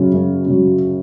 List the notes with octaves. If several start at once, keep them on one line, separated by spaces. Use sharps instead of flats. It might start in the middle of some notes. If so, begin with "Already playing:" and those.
Already playing: F#2 C#3 F#3
F#2
C#3 F#3